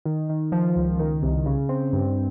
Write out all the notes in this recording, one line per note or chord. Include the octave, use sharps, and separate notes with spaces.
D#3
D#3
F3
C#2
D#3
C2
C#3
C4
G2